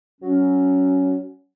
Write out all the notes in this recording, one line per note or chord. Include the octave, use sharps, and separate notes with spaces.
F#3 C#4